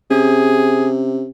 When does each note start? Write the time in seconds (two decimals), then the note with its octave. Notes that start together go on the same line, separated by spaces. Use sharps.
0.11 C3 C#4 G#4